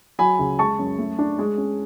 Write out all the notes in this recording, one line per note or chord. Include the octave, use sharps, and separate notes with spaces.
F#3 G#5 B5
C#2
G#3 A5 C#6
F#2
A3
D4
G#3
C#4